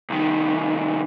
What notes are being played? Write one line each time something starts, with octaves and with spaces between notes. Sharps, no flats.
C2 D#3